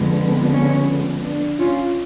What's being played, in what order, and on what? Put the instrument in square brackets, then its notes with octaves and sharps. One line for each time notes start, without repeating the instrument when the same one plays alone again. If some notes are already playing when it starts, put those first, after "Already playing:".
Already playing: [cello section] F2 D3 G#3 B3
C#4
D4
C#4 F4